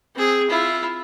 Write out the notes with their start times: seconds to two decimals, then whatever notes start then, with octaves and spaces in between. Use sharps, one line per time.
0.14 C4 G#4
0.49 E4 F4